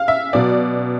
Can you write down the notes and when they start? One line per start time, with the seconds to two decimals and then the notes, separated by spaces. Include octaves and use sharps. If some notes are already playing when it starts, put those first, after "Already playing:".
Already playing: F5
0.08 E5
0.33 B2 F#3 D5